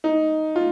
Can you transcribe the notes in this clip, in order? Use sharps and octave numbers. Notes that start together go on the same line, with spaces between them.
D#4
F4